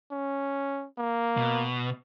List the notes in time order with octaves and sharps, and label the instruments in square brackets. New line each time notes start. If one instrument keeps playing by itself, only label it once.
[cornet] C#4
A#3
[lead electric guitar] B2